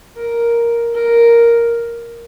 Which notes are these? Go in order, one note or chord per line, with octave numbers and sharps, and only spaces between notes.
A#4
A#4